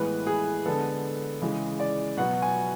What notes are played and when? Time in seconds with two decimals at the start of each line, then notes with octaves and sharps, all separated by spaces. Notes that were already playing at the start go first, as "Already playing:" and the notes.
Already playing: A2 E3 G#3 B3 B4
0.27 G#4
0.66 D3 G#3 B3 A4
1.42 C#3 E3 G#3
1.80 D5
2.17 B2 F#3 B3 F#5
2.42 G#5